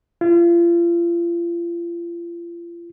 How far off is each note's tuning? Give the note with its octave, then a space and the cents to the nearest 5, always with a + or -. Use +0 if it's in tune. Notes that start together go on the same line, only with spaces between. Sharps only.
F4 -35